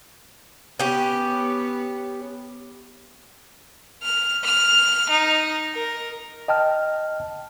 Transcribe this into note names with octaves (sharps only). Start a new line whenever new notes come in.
B3 C#4 G4
F6
F6
D#4
A#4
D#5 G5 A5 F6